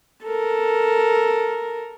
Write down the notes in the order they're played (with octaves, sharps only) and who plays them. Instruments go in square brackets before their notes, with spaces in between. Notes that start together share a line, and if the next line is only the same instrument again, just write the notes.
[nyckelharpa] A4 A#4